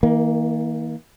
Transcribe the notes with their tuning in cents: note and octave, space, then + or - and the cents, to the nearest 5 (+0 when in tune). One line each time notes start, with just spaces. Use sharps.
D#3 +45 A#3 +0